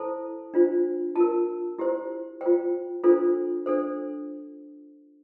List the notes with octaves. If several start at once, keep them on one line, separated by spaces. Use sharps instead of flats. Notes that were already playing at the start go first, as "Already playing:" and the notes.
Already playing: E4 A4 C5 A5
D4 F4 C5
F4 A#4 A5
E4 G4 C5
F4 C5 G5
D4 F4 A4 C5
D4 A4 C5